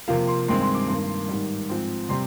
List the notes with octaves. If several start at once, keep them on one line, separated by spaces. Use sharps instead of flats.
C3 F3 A#3 F5
C6
G2 D#3 G#3 C4 C6
C6
D6
G2 D#3 A#3 C6
G#2 D#3 G3
G#2 F3 C4
C3 G3 C4 C6